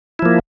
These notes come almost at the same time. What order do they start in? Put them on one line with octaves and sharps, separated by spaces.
E4 F3 A#3